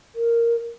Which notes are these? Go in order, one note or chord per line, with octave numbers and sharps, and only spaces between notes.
A#4